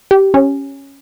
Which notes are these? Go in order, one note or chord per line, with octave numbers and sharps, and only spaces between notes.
G4
C#4